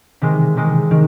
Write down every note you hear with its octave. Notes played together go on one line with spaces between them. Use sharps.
C3 D#3 G#3
C3 D#3 G#3
D#3